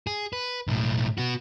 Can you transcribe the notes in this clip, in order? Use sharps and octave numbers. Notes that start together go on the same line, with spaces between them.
G#4
B4
B1 A2
B3 F#4